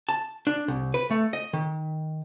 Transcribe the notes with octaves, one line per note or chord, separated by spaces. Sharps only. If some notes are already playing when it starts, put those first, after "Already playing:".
A5
D4
C2
B4
A3
D#5
D#3